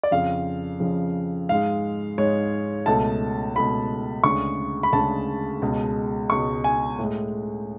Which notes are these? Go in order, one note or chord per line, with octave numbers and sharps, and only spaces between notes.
D5
F2 C#3 F3 F5
F2 C#3 F3
G#2 G#3 F5
G#2 G#3 C#5
C#2 B2 A3 A5
C#2 B2 A3 B5
D2 C#3 G#3 C#6
B5
D2 C#3 G#3 A5
C#2 B2 G#3
C#2 B2 G#3 C#6
G#5
A2 G#3